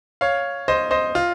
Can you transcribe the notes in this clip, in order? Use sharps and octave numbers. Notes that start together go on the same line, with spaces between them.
C#5 F5
C5 D#5
C5 D#5
F4